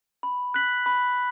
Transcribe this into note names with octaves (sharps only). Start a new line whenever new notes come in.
B5
F#6 B6 F#7
B5